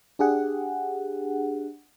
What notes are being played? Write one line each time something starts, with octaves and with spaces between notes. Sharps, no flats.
D4 G4 G#4 F#5